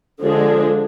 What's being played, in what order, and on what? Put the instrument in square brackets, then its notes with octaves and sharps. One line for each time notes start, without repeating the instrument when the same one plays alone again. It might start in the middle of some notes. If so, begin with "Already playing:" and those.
[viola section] D3 F3 G#3 D4 G#4